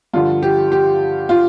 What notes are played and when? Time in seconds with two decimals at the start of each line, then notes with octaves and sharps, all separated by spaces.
0.14 G2 D3 F3 F4
0.42 G4
0.72 G4
1.29 F4